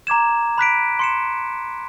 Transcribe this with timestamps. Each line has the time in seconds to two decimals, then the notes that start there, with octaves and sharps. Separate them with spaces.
0.07 A#5 D6 G#6 E7
0.58 B5 F#6 B6 D7
0.99 C6 C#7 E7